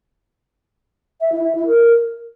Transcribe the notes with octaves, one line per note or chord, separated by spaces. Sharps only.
E5
E4
E5
E4
A#4